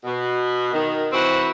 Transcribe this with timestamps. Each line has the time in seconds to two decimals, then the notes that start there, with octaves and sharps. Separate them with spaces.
0.04 B2
0.73 D#3
1.12 E3 C4 F#4